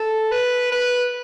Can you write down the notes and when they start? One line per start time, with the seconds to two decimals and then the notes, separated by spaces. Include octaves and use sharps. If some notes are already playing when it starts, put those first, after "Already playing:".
Already playing: A4
0.32 B4
0.72 B4